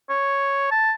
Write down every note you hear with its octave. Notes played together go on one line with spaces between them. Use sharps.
C#5
A5